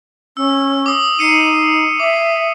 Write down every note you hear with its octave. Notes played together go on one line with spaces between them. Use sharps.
C#4 E6
D6 D#6
D#4 C7 C#7 D#7
E5 D6